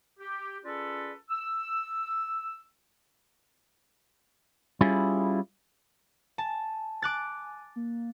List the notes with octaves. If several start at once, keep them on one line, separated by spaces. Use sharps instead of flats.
G4
C#4 F4 G#4 A4 B4 D5
E6
G3 C#4 E4 F4 G#4
G#5 A5
D6 F#6 A6
A#3